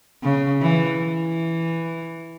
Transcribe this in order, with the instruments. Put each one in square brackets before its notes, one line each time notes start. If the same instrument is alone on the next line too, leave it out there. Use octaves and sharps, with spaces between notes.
[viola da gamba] C#3
E3
E3